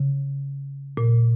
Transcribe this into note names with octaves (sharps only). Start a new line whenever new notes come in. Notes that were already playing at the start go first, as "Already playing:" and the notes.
Already playing: C#3
A#2